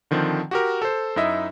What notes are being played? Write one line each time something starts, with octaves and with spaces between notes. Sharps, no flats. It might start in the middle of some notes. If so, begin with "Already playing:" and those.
D3 D#3 F3 C4
F#4 G4 A#4
A4 C5
F#2 D#4 E4 D#5 E5